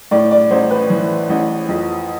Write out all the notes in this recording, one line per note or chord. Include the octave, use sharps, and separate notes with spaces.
A2 D5
D5
A1 C5
B4
E3
A1
F2